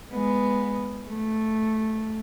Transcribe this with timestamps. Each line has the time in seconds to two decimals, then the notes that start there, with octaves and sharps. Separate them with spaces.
0.12 G#3 B3
1.09 A3